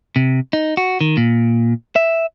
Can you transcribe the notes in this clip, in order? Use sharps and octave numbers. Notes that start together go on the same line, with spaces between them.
C3
D#4
F#4
D#3
A#2
E5